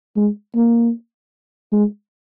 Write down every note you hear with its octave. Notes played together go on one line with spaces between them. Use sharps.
G#3
A#3
G#3